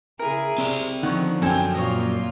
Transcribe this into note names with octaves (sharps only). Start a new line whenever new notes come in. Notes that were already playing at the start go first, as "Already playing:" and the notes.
C#3 E4 G#4 A#4
C3 C4 D5
D3 D#3 F3 C#5 F#5
F#2 C4 A4 G5 G#5
A#2 A#3 F4 C#5 D#5